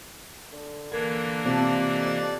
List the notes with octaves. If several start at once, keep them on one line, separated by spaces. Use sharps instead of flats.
D3
E3 A#3 D4 A#4 G#6
C3 F3 D5 A5
F2